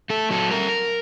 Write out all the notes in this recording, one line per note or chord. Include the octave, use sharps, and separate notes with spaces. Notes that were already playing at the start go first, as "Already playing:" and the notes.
A3 A4
F#3 A4
G3 A#4